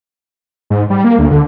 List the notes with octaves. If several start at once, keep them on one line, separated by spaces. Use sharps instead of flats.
G#2
G3
A#3
D2
D3